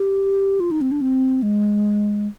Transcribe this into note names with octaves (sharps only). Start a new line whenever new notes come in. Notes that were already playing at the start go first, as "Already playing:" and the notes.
Already playing: G4
F4
D#4
C4
D4
C4
G#3